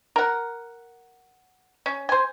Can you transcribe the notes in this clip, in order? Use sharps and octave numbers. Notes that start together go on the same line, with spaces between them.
A#4 F#5
C#4
C5 G#5